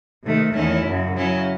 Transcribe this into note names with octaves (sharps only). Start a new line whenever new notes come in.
C3 D#3 A3
E2 D#3 A3 C#4 E4
F#2 C#3 F#3
C#3 F#3 C#4 E4